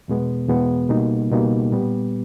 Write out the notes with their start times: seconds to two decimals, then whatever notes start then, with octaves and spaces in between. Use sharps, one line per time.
0.08 E2 B2 G#3 B3
0.49 E2 B2 G#3 B3
0.89 C#2 B2 G3 A#3 D#4
1.31 C#2 B2 G3 A#3 D#4
1.71 A#2 G3 B3